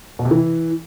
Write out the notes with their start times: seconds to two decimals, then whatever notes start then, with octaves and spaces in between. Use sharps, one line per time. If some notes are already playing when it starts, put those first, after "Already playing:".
0.19 B2
0.25 C3
0.31 E3